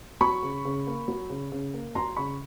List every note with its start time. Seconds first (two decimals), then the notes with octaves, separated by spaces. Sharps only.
0.21 F#3 B5 C#6
0.43 C#3
0.65 C#3
0.87 A#3
1.08 F#3
1.30 C#3
1.52 C#3
1.74 A#3
1.95 F#3 A#5 C6
2.16 C#3 B5 C#6